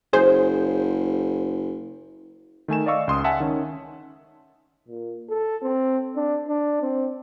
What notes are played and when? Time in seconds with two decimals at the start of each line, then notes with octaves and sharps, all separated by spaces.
0.13 F#1 G#4 C5
2.68 D#3 A3 G#5 E7
2.86 D5 D#5 F5 C#6 E6
3.08 C#2 C6 D#6
3.24 E5 F#5 G#5 A5
3.40 D#3 C#4
4.88 A#2
5.29 A4
5.63 C4
6.16 D4
6.48 D4
6.82 C4